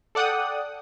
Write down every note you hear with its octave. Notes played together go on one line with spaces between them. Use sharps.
A4 D5 F#5 G5 D#6